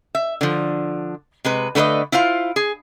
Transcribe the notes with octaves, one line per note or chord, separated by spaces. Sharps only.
E5
D3 F3
C3 G#3 B4
D3 A3 B4 C5 D#5
E4 F4 C5 F5
G#4